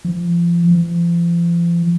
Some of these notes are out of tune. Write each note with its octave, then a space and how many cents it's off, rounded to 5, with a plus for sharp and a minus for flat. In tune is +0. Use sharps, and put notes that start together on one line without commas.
F3 -30
F3 -40